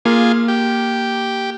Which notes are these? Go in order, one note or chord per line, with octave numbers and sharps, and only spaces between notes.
A#3 F4 G#4
G4